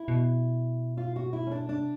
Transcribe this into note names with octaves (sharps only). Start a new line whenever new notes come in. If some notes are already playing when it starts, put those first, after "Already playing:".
Already playing: E4
B2
F4
F#4
E4
C#4
D4
C3 D4